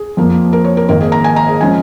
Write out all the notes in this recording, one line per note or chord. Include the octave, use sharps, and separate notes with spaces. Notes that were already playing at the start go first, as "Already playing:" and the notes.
Already playing: G#4
F2 F3 A#3
A#4
C#5
A#4
G#1 G#2 D#3 A#3 A#4
G#4
A#5
G#5
A#5
G#4
F3 G#3 C#4 G#5